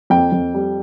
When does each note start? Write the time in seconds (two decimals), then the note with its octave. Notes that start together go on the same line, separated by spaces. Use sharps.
0.10 F2 G5
0.32 F2
0.55 G3